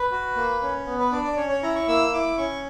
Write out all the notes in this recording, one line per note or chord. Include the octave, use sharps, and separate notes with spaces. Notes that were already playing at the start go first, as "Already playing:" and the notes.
Already playing: B4
F#4
A#3
C#4
B3
B4
D4 D5
D5
C#4 C#5
C#5
E4 A#5
C#6
A#3 E6
E4 D6
C#4 C#6